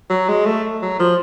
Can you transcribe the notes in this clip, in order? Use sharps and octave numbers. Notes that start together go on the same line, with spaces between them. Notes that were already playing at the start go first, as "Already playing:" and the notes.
F#3
G#3
A3
F#3
F3